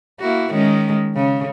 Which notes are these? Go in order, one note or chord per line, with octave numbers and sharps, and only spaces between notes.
A#3 E4 F#4
D#3 G#3 C#4
C#3